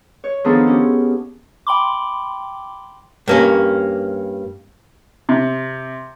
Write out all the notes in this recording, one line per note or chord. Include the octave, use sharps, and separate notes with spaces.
C#5
D#3 F3 B3 D4 G#4 A4
C#4 G4
G5 B5 C6 D6
G2 A#3 C#4
C3